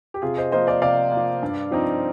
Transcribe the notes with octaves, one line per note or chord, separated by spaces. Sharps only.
G4
C3 F4 G#4
C5 D#5
F3 A#3 C5 D#5
D5 F5
C3 D5 F5
A#3
F3
G2
F3 C4 D#4